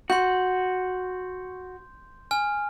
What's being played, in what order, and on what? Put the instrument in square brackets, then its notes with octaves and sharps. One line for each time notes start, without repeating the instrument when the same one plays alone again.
[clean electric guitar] F#4 [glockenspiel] C6 G6
[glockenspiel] G#5 F6